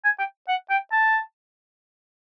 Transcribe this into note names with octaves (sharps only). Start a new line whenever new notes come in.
G#5
G5
F#5
G5
A5